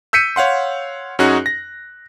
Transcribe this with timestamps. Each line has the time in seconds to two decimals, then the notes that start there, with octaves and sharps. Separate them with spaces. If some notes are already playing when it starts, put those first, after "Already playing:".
0.13 E6 G6 B6 C#7 D#7
0.36 C#5 F5 F#5 C6
1.19 F#2 C#4 D#4 F#4 G#4 F#6
1.46 A#6